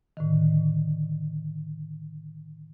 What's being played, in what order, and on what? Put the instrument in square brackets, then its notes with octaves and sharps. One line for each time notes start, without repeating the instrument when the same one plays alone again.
[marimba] A2 D3 D#3